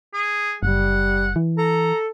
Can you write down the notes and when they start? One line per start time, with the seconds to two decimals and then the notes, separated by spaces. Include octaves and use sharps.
0.14 G#4
0.63 F#1 G3 F#5
1.36 E3
1.58 A4 A#5